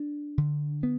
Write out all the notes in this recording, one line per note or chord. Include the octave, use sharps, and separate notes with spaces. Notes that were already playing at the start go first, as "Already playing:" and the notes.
Already playing: D4
D3
B3